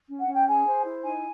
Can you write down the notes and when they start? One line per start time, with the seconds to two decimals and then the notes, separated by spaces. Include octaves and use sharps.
0.09 C#4
0.18 F#5
0.28 C#4 G5
0.46 G#4 G#5
0.66 C5
0.84 E4
1.03 D#4 G#5